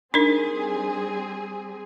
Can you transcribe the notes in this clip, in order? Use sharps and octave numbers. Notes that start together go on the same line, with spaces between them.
G3 C4 D4 D#4 G#4 A#4